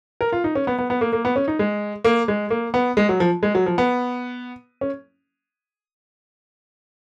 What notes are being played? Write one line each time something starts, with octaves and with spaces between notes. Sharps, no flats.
A#4
F4
D#4
C#4
B3
B3
B3
A#3
A#3
B3
C#4
D#4
G#3
A#3
G#3
A#3
B3
G#3
F#3
F3
G#3
F#3
F3
B3
C#4